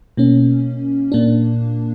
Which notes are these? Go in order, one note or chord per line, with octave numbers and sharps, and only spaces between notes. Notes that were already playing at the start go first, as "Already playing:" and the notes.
B2 A#3 C#4
A#2 A#3 D4